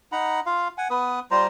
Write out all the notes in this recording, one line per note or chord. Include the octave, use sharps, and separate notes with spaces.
D#4 F#5 A#5 B5
F4 F5
F#5 G#5
B3 B4 D#6
G3 F4 C5 A#5